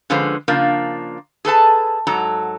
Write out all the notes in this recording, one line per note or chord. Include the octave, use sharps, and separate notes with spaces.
D3 F3 G#3 C#4 B4 C5
C#3 F3 A#3 D4 F4 A#4
G#4 A4 B4 A5
G#2 F#3 A4 A#5